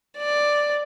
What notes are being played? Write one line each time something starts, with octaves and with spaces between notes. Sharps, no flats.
D5